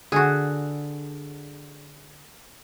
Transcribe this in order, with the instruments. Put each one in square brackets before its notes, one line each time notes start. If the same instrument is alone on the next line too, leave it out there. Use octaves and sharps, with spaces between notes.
[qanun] D3 [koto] F#4 G#4